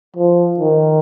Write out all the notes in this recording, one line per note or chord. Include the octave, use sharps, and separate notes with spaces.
F3
D#3